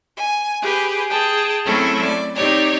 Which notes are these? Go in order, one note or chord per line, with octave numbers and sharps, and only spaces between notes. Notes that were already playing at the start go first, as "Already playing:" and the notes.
G#5
G4 G#4 B4
G#4 G5 A5
F#3 A3 C4 C#4 E4 A4
D5
C4 D#4 G4 C#5 D5